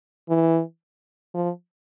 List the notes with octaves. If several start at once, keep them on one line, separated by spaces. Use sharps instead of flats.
E3
F3